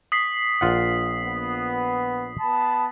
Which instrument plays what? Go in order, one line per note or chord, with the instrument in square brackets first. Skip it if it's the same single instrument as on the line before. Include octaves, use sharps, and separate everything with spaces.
[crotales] D#6 B6 C7
[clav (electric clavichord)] A#1 F4 F#5
[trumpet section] B3
B3 A5 B5